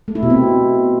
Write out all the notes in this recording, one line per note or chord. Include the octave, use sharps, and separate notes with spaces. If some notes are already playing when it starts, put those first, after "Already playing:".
A3
E4
B2
C4